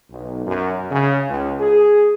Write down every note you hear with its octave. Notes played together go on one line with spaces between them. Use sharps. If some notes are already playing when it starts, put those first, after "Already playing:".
B1
F#2
C#3
C#2
G#4